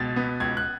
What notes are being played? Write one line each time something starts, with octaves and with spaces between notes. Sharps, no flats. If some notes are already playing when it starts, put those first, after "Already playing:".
Already playing: C#2 B2 A6
B3
C#2 G#6
F#6